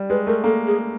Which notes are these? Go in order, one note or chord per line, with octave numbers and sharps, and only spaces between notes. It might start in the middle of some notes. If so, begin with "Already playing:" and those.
Already playing: G3
G#3 B4
A3 A#4
A#3 A4
G#4